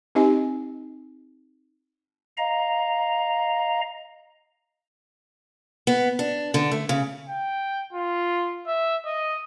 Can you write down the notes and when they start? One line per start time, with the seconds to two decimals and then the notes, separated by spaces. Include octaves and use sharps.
0.15 C4 D#4 G4 D#5 G#5
2.37 D#5 F5 A#5
5.87 B3
6.19 D4
6.54 D3
6.71 A3
6.89 C#3
7.28 G5
7.93 F4
8.66 E5
9.05 D#5